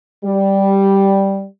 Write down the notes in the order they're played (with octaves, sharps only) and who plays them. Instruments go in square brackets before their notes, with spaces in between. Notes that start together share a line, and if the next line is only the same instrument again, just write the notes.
[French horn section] G3